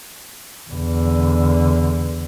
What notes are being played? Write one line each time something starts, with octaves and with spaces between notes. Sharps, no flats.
E2 D3